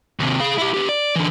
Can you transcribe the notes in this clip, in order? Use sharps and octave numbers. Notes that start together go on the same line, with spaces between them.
D#2 C3
G#4 F5
E4 G4
B3 G4
D5
D3 E3